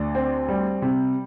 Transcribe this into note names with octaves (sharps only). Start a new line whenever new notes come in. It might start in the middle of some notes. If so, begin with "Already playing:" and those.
Already playing: D2 D4
C4
G3
C3